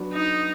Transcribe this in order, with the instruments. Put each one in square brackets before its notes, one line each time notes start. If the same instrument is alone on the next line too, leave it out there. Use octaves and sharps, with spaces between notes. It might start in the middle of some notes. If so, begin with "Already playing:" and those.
Already playing: [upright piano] F#3 B3 D4 F#4
[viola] D#4